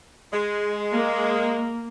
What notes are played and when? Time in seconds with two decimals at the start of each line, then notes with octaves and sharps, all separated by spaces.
0.33 G#3
0.90 A#3